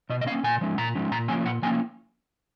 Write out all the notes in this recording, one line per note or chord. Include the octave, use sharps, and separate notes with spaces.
B2 D#5
D#5
A#3 C#4 F5
A#2 G#5
F3 G#3 C#4
A#2 A#5
F3 G#3 C#4
A#2 A#5
F3 A#3 C#4 G#5
A#2 F#5
F3 A#3 C#4 G#5